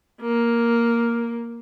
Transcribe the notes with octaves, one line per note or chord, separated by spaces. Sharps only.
A#3